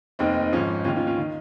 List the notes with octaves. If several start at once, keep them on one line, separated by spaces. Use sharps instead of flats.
F1 D#2 D#3 C4 D#4
G#1 G#2 F3 C#4 F4
D#2 D#3 C#4 F4
C#4 F4
C#4 F4
D#3